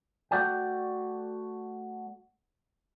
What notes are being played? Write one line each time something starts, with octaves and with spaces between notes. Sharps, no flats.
A3 F#4 D5 G5